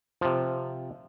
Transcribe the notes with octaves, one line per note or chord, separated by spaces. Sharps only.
C3 F3